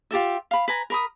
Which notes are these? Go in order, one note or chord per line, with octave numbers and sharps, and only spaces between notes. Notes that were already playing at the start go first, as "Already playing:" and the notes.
F4 G4 A4 E5
F5 B5
B4 G#5 A#5
A#4 B5 D#6